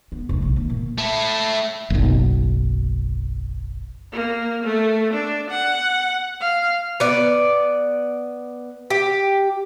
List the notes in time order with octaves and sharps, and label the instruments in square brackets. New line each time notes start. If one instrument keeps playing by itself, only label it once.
[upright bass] B3
F1 C2
A#1
D#3
A#2
[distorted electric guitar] A3 E4
[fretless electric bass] F#1 B1
[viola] A#3
A3
D4
F#5
F5
[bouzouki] B3 D5
G4